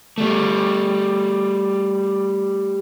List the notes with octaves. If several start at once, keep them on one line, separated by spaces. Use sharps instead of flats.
G3 A3